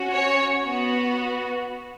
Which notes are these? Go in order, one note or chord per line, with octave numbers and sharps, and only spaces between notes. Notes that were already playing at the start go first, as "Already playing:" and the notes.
Already playing: C#4 F#4
C#5
B3 F#4